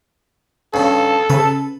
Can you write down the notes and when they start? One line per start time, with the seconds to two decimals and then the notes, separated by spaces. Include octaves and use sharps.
0.74 G2 C#3 A4
1.30 C#3 B4